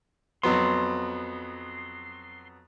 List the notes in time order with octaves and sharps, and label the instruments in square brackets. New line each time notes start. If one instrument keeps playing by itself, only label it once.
[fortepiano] F2 F#3 B3 [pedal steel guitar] C6